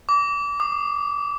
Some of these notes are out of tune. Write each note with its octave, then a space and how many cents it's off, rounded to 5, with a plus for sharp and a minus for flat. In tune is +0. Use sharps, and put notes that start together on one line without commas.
D6 -30
D6 +35